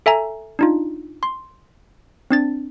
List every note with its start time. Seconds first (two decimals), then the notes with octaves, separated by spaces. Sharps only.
0.06 A4 E5 G#5 A#5
0.59 D4 D#4 F4
1.23 C6
2.31 C4 D4 A6